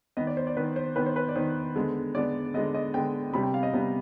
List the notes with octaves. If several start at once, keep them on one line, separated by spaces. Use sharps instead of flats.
D#3 B3 D#5
D5
C5
D5
D#3 B3 B4
C5
D#3 B3 B4
C5
B4
D5
D#3 B3 C5
D3 G#3 B3
D3 G#3 B3 D5
D3 G#3 B3 D#5
D#5
D3 G#3 B3 G5
C3 G3 B3 B5
G5
F5
D#5
C3 G3 B3